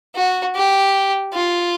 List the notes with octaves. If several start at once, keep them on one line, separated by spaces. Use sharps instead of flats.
F#4
G4
F4